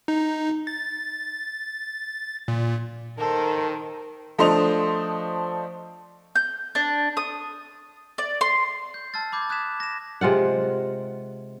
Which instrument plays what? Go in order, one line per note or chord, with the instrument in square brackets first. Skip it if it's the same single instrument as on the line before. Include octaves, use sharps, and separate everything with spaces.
[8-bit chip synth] D#4
A6
A#2
[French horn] D#3 [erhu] A4 [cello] A#4 C5
[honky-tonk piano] F3 A3 D4 C5 D#5 F7
[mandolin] G6
D4
D#6
D5
C6
[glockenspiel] G6
A5 E6 F6 A6
B5 D6 G6 G#6
D#6 F#6 G#6 B6 E7
A#6 E7
[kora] C3 G#3 F4 F#5